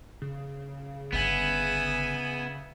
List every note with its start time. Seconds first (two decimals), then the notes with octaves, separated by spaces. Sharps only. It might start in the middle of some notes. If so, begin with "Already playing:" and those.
0.22 C#3
1.13 G1 D3 B3 E5 G#5